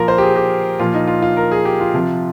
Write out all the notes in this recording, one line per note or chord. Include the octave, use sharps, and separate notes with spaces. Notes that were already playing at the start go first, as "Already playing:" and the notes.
Already playing: A#2 F3 F4 A#4
C5
G4
G#4
G4
A#2 F3 F4
D#4
F4
F4
A#4
G#4
G4
F4
C3 F3